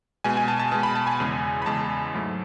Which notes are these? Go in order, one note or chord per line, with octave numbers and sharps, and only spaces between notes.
B2 G#3 G#5
G#5
A5
A5
B2 G#3 A5
B5
A5
G#5
E2 C#3 G#3
B5
E2 C#3 G#3 A5
G#2 F#3 A3